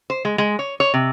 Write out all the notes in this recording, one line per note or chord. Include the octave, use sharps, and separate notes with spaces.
C5
G#3
G#3
C#5
C#5
C3